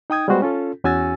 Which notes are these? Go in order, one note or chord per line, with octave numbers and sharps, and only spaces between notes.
D#4 G5 D#6 G#6
G3 G#3 B3 F#4 C5
C#4 F4 A4
E2 C#4 F#4 G#5 E6 A6